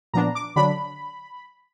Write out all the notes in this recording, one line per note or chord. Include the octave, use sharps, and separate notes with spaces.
A#2 F3 B3 D4 A#5
D6
D3 F#3 D4 B5